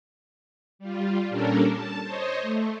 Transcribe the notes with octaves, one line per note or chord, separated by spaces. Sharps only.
G3 F4
A#2 G3 C#4 D4 A4 A#4
A5
C5 C#5 D#5
A3